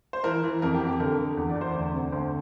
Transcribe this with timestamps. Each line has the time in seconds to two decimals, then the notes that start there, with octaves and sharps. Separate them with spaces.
0.13 C5
0.24 E3 A#4
0.43 E3
0.62 F2 A#4
0.75 G4
0.81 F2
0.87 G4
1.00 D3 A#4
1.18 D3
1.37 E2
1.50 D5
1.56 E2
1.61 C5
1.73 D2 D5
1.94 C3
2.12 D2 C5